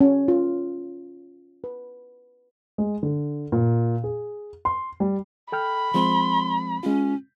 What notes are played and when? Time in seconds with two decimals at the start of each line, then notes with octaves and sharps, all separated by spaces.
0.01 C#4
0.28 F4
1.64 B4
2.78 G#3
3.03 D3
3.52 A#2
4.04 G#4
4.65 C6
5.00 G3
5.52 A4 G5 B5 F6
5.94 F3 G#3 C4 C6
6.83 G#3 C#4 F4